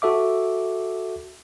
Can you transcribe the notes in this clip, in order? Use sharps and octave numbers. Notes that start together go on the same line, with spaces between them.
F#4 A4 E5 D6